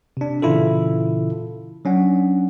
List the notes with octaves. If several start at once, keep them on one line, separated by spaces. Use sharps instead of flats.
C3 D4
A#2 C#3 E3 E4 F4 A4
F#3 C#4 D4 F#5